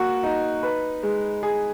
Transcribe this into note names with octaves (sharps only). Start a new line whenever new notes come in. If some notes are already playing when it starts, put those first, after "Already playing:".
Already playing: A#3 F#4
D#4
B4
G#3
G#4